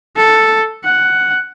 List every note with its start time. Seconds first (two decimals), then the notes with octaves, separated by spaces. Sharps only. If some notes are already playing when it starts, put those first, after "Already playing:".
0.16 A4
0.85 F#5